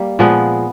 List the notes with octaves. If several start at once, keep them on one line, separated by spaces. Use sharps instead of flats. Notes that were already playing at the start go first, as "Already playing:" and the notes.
Already playing: G3 A#3
A#2 F3 G#3 B3